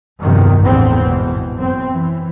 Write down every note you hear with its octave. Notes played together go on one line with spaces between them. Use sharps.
E2 G2 C3 D#3 F3
A1 E2 G#2 D3 B3 C4
G#1 B2 E3
F#2 B2 C4
E3